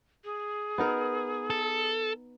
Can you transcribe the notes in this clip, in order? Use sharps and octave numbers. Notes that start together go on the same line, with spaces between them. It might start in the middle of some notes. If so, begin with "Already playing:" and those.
G#4
B3 D#4 A#4
A4